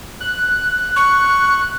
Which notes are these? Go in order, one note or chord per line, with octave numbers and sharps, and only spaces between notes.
F#6
C#6